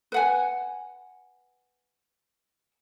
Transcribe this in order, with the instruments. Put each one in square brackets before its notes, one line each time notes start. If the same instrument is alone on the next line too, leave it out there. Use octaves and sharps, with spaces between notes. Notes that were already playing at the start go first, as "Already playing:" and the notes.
[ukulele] B4 F#5 G#5